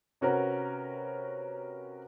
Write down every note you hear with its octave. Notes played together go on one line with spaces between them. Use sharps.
C3 C#4 F#4 A#4 B4